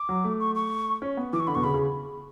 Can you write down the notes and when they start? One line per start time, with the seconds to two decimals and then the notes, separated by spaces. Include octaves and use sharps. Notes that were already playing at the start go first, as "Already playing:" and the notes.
Already playing: D6
0.09 F#3
0.24 A3
0.40 C#6
0.55 C#6
1.02 C#4
1.17 B3
1.33 E3 D6
1.40 C#6
1.47 D3 B5
1.55 B2 C#6
1.64 C#3 B5
1.74 C#3